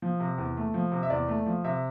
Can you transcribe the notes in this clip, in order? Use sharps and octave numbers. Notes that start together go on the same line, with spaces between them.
F3
C3
E2
A3
F3
C3
E5
E2 D5
A3
F3
C3 E5